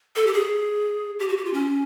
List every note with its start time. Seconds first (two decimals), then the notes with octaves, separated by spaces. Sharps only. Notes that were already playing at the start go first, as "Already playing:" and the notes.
0.16 A4
0.27 G4
0.33 G#4
1.19 G4
1.29 F#4
1.37 G4
1.45 F4
1.53 C#4